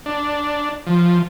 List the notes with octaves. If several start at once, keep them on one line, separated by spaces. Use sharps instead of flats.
D4
F3